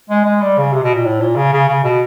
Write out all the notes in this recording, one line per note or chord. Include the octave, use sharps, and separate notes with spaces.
G#3
G#3
G3
C#3
C3
B2
A#2
A2
A#2
C#3
C#3
C#3
B2